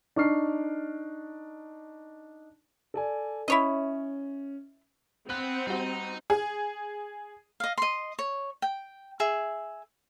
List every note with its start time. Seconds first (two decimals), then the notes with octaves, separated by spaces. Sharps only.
0.16 D4 D#4 C#6 F6 C7
2.94 A4 D5 G#5
3.48 C#4 E4 C#5 D#5
5.30 B3 C4 F#6
5.67 G3 D#4 F#4
6.30 G#4
7.60 D#5 F5
7.78 D#5 C6
8.19 C#5
8.62 G5
9.20 G#4 E5